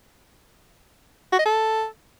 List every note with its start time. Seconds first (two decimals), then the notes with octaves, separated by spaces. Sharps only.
1.33 F#4
1.39 D#5
1.45 A4